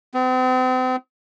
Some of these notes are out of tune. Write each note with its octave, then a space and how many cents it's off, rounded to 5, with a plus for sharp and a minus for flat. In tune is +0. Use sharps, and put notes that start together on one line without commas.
C4 -40